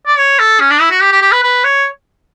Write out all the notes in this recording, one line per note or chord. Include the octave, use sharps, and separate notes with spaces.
D5
C#5
A4
C#4
D4
E4
F#4
G4
G4
G4
B4
B4
C#5